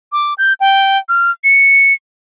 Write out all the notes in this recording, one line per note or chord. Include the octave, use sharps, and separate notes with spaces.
D6
G6
G5
F6
C#7